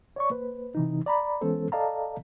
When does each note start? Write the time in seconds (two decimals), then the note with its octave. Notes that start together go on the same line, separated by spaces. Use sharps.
0.16 C#5 D5 C#6
0.30 A#3 B4 C5
0.75 C3 E3 D#4
1.06 D5 A#5 B5
1.41 E3 G#3 B3 C#4 A4 C5
1.72 A4 D5 D#5 F5 A5 A#5